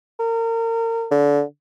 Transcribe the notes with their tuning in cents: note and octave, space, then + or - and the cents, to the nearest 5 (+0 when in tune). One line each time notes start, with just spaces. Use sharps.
A#4 -30
D3 -25